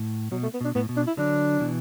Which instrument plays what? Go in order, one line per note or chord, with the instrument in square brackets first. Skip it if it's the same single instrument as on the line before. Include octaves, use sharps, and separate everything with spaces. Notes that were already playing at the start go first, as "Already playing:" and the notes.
Already playing: [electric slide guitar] A2
[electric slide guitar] B2 [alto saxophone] F#3
[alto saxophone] A3
B3
[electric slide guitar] B2 [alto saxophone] D4
[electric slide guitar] A2 [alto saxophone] B3
[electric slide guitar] B2
[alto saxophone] D4
E4
[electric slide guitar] D3 F#3 [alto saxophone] D4
[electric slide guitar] B2 E3